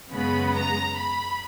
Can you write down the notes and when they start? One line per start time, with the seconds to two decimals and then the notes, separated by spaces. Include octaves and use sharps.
0.13 F#2 C#3 G#3 B3 B5
0.55 A#5
0.98 B5